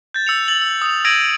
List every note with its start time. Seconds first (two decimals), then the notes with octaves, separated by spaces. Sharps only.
0.14 G6 A6
0.27 E6 C#7 F7
0.48 A6 F#7
0.62 E6
0.82 D#6 F7
1.05 E6 G#6 A#6 D7 D#7 F#7